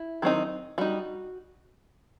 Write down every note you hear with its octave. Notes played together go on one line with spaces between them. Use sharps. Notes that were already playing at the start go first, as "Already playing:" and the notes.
Already playing: E4
D#3 F#3 C4 D#4
G3 D#4 F#4